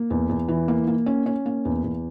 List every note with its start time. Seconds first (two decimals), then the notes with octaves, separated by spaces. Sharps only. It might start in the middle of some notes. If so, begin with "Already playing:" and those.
Already playing: A#3
0.10 E2
0.29 E2
0.48 E3
0.68 A#3
0.87 A#3
1.06 C#4
1.26 C#4
1.46 A#3
1.65 E2
1.84 E2